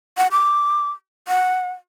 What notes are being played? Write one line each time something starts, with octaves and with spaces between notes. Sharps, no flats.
F#5
D6
F#5